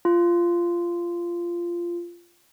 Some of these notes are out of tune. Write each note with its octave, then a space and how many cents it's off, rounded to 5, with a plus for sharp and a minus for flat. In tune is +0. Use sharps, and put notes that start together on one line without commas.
F4 -15